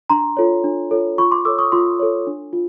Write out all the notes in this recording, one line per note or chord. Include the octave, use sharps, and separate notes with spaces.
D4 A#5 C6
F4 A4 C#5
D4
F4 A4 C#5
F4 B5 C#6
C6 D6
A4 C#5 D6 E6
C#6 D#6
F4 C6 D6
A4 C#5
D4
F4